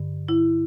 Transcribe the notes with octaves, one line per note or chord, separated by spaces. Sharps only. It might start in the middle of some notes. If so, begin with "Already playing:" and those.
Already playing: G2 D3
E4